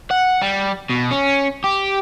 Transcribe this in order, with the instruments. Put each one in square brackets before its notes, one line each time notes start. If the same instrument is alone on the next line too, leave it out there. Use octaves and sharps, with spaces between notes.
[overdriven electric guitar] F#5
G3
B2
C#4
G4